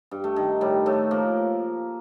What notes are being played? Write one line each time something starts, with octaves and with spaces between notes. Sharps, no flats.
G2
A3
D#3
A2 G3
A2 A3
F3 A#3